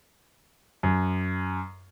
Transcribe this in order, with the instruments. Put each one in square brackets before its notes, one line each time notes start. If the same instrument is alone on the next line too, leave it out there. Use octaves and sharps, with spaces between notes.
[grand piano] F#2